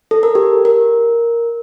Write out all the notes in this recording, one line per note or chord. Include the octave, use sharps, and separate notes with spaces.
A4
A#4
G4
A#4